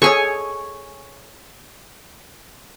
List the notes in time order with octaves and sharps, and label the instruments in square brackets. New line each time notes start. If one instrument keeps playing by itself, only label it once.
[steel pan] G#4 A4 [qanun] C#5 G#5 C#6